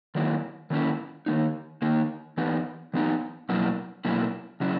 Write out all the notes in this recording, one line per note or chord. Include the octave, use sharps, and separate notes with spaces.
D#3 F#3 A#3 C#4 E4
D#3 F#3 A#3 C#4 E4
D#3 A#3 D#4
D#3 A#3 D#4
E3 B3 D#4
E3 B3 D#4
B2 F#3 A#3 E4
B2 F#3 A#3 E4
C#3 F#3 C#4 E4